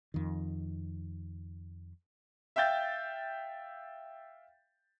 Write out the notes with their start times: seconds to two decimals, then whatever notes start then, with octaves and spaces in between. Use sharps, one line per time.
0.14 F2 D#3
2.56 E5 F5 G5 G6 A6